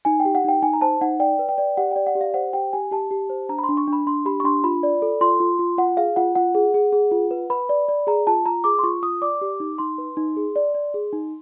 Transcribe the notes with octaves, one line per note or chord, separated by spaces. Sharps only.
D#4 G#5
G5
G4
F#5
D#4 G5
D#4 G#5
A#5
C5 A5
D#4 F#5
D5 G5
B4
G5
D5
G4 F#5
D5 G5
F#5
G4
F5
C5 F#5
G4 G5
G4 G#5
G4 A5
G4
C5
D4 A#5
B5
C6
D4
C#6
D4
B5
D4 C6
G4 B5
C#6
D4 C6
F4 B5
D5
A4
F4 C6
F4
F4
F4 F#5
G#4 F5
F4 F#5
F4 F#5
G#4
G#4
G#4
F4
B4
B4 B5
D5
D5
G#4 A#5
F4 A5
F4 A#5
G#4 D6
C6
F4 C#6
F4 D#6
D5 D6
G4
D#4
D#4 C6
B4
D#4
G#4
D5
D5
G#4
D#4